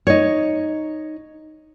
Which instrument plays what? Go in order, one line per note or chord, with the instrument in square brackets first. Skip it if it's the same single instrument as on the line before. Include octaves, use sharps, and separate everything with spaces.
[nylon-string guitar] D#4 C#5